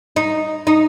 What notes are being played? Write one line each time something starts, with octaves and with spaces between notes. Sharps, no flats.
D#4
D#4